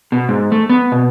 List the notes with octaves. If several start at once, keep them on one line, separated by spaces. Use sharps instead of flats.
B2
G#2
A3
B3
B2